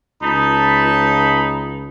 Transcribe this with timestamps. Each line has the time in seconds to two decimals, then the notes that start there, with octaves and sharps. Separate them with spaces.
0.22 C#2 D#4 A5 B5